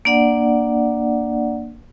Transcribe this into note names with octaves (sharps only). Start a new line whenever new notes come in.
A#3 D4 D5 F#5